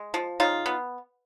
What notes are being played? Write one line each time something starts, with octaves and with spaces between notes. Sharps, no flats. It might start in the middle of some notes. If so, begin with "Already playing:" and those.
Already playing: G#3
F3
C#3 D#4 F4
B3